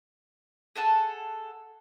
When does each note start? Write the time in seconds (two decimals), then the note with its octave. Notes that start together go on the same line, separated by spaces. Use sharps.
0.76 G#4 A4 F#5 A5